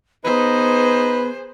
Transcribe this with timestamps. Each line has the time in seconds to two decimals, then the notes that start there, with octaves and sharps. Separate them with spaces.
0.25 B3 D#4 G#4 B4 C5